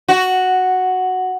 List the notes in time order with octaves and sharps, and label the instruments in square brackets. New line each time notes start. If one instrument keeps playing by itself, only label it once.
[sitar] F#4